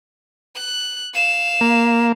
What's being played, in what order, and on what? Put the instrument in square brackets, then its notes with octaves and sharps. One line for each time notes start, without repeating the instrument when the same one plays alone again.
[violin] F#6
F5 E7
[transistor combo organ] A#3